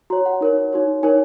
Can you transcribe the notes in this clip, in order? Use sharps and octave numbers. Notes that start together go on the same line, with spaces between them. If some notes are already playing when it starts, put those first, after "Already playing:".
F#4 C#5 A#5
F#5
D#4 A#4 C#5
D#4 F#4 C#5
D#4 A#4 C#5 G#5